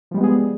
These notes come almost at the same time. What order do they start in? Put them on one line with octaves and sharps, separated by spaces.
F3 G3 G#3 B3 G#4